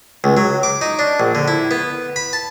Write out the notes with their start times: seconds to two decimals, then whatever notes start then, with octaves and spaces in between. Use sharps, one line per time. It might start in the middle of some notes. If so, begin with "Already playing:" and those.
0.24 C#2
0.37 F#3
0.63 D6
0.81 D#4
0.99 D4
1.20 A#1
1.35 D3
1.48 E4
1.71 B3
2.16 B5
2.33 A5